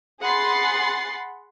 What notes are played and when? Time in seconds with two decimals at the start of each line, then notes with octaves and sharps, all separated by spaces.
0.22 G#4 F#5 B5 C6 A6 C7